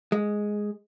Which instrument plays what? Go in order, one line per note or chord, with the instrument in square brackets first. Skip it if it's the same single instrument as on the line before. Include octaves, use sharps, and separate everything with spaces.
[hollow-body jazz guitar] G#3